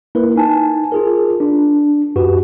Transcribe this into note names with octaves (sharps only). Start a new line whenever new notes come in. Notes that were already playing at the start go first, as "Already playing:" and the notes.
A#3 E4 A#4 B4
D#4 G#5 A5
F4 G#4 A#4
D4
F#2 F#4 G4 B4